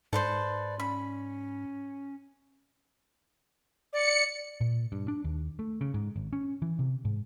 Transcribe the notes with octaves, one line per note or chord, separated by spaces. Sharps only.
G#2 A4 B4 C5 D5
C#4 B5
D5 C#7
A#2
G2
D4
D#2
A3
C#3
G#2
G#1
C#4
E3
C3
G#2